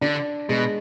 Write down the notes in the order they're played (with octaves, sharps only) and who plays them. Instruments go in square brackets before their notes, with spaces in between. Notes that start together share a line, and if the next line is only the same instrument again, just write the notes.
[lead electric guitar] D3 [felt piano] D4
[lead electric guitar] B2 [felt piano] G#3